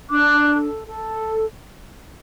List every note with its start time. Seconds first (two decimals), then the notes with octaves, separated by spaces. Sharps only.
0.10 D4 D6 F#6
0.48 A4
0.86 A4